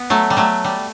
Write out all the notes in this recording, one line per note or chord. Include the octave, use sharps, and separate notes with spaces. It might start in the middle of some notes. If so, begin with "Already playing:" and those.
Already playing: B3
F#3 A3
G3
F#3 A3
G3